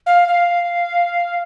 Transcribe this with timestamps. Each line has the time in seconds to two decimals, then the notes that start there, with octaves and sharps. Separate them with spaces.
0.06 F5
0.28 F5